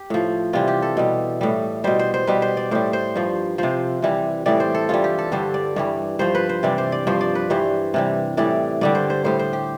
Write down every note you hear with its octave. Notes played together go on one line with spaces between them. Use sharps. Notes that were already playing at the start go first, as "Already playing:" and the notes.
Already playing: G4
A2 F3
C3 E3 G3 F4
G4
A4
B2 G3
A2 G3
B2 G3 C5
C5
C5
B2 G3 B4
C5
D5
A2 G3 C5
C5
G2 F3
C3 F3 C5
C3 E3 G3
A2 E3 G3 D5
C5
A4
G2 E3 G3 F4
G4
A4
G2 D3 G3 C5
D5
G2 E3 G3
G2 F3 C5
B4
C5
C3 E3 G3 D5
C5
D5
G2 F3 C5
D5
B4
G2 E3 G3 C5
C3 E3 G3
A2 E3 G3 D5
G2 D3 G3 D5
C5
C5
A2 G3 C5
C5
G4